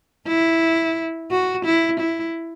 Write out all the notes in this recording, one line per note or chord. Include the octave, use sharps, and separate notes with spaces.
E4
F#4
E4
E4